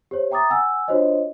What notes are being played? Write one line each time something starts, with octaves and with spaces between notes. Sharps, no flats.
G4 C5 C#5
E5 G5 A#5 D6 D#6 A6
F#5 G#5 E6
D4 F4 F#4 C5 C#5 D#5